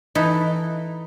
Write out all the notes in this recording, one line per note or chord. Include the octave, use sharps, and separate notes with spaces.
E3 D#4 A4 B4